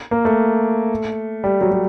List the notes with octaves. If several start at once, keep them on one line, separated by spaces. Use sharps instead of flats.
A#3
A3
G3
F#3
F#3